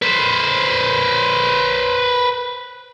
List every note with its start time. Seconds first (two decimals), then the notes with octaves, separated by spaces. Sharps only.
0.02 B4 C5